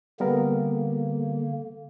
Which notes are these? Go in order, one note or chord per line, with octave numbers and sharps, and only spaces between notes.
D3 G3 A#3 B3 A#4